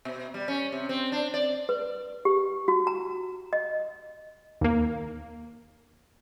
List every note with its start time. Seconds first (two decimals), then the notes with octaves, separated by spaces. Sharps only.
0.05 B2
0.34 G3
0.48 C#4
0.72 C3
0.89 C4
1.12 D4
1.34 D5
1.69 B4
2.25 G4
2.68 F#4
2.87 A#5
3.53 D#5
4.61 D#2 A#3